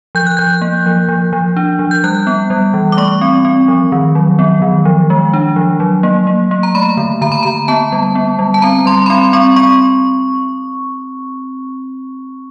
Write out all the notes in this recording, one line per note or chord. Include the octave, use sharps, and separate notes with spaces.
F3 G6
F#6
F3 G6
A#3
F3
F3
F3
D4
F3
G6
G3 F#6
B3
G3
E3
D6
A3 C#6
C4
C4
F3
D#3
F#3
B3
D#3
F3
G#3
D4
F3
F#3
A#3
A#3
A#3
A#5
A3 B5
D3
D3 A#5
B5
D3 A#5
B3 A5
G3
B3
G3
A5
C4 A#5
G3 C6
B5
C4 C6
C4 C#6
C4 C#6